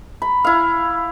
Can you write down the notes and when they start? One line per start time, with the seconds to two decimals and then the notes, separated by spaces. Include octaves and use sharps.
0.22 B5
0.44 E4 F5